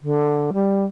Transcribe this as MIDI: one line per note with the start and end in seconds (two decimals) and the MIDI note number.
0.02 0.51 50
0.53 0.85 55